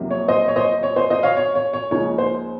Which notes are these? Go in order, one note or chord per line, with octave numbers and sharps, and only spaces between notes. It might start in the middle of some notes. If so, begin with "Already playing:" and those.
Already playing: F2 C3 F#3 A#3 D#4
C#5
C5 D#5
C#5
C5 D#5
C#5
C5 D#5
C5 D#5
C#5 F5
C#5
C#5
C#5
C#2 C#3 F3 A#3 D#4 C#5
C5